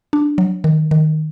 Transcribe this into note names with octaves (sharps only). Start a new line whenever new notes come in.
D4
F#3
D#3
D#3